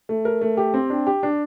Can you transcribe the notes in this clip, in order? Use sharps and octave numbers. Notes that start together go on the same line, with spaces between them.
A3
A#4
A3
G4
C4
D4
G4
D4